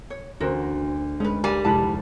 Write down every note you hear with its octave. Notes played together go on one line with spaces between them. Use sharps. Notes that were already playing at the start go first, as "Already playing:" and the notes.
C#5
D2 C#4 F#4 A#4 C5
G#3 C#4 B4
G3 A#4 G#5
F1 G#3 E4 A5 B5